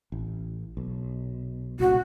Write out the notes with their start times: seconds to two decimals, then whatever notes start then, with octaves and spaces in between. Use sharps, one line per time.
0.12 A1
0.77 B1
1.80 C2 A#2 C#3 F#4